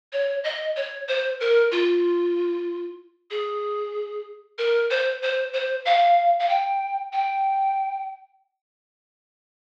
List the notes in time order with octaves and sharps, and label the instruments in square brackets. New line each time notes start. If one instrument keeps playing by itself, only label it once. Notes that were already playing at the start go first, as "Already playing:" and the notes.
[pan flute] C#5
D#5
C#5
C5
A#4
F4
G#4
A#4
C5
C5
C5
F5
F5
G5
G5